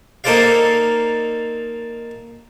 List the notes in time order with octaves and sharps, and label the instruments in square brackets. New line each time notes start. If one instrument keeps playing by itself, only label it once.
[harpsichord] A#3 D#4 A4 C5 D5 F5